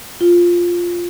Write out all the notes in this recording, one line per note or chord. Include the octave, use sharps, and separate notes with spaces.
F4